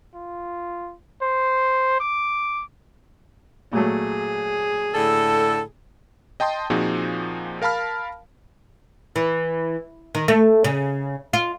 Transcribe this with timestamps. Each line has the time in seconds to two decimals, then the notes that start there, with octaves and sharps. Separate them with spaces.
0.14 F4
1.22 C5
2.00 D6
3.73 A#2 F#3 A3 G#4
4.94 A2 D3 A4
6.40 D#5 G5 A5 C6 D#6
6.70 A#2 F3 C4 D#4 F#4 G#4
7.62 A#4 F5 A5 B5 F6
9.16 E3
10.15 D#3
10.28 A3
10.64 C#3
11.33 F4